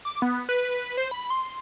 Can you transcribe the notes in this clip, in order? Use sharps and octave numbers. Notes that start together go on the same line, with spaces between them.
D6
B3
B4
C5
B5
C6